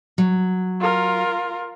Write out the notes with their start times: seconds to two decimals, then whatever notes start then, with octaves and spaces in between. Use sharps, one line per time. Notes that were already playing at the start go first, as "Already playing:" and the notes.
0.18 F#3
0.80 F4 A#4